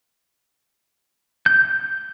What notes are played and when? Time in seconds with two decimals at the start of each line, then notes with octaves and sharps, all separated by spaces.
1.46 G6